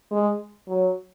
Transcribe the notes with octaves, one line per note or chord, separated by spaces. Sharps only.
G#3
F#3